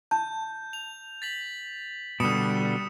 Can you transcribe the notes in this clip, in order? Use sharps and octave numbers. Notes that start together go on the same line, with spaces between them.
A5 G6
F7
A6 B6 F#7
B2 D3 G3 D#6 C#7 E7